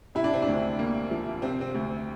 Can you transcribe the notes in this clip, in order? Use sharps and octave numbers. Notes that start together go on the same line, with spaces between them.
C3 E4
D4
C4
D4
D2
A#3
F3
C3 C4
C4
D2